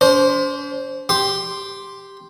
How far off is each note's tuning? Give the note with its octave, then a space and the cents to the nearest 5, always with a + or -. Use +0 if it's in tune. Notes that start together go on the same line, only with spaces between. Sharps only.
D4 -45 C5 +0
G4 +0 C6 +0